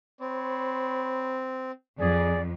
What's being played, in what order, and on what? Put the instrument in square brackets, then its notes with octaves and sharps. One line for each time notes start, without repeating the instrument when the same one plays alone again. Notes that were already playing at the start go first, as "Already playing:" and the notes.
[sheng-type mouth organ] C4 [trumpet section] C5 C#5 B5
[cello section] F2 [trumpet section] G#4 [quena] D5